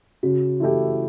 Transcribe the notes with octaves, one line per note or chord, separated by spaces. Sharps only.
C#3 F#4
E3 A3 E4 G4